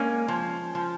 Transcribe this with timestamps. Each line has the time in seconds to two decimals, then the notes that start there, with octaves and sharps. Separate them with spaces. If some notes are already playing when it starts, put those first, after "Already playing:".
Already playing: G#3 A#3 C#4
0.28 F3
0.75 F3